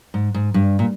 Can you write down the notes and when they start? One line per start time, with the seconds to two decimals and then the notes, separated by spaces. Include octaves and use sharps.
0.14 G#2
0.34 G#2
0.54 G2
0.79 A#2